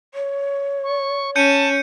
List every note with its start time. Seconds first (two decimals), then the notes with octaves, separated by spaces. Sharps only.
0.14 C#5
0.83 C#6
1.36 C#4 A5 G6 C#7 D#7